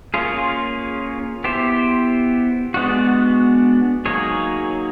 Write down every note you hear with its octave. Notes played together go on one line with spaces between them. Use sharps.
A#3 C#4 F4 G#4
B3 E4 G4 C5
G#3 B3 D4 F#4
F#3 A#3 D#4 G#4 C#5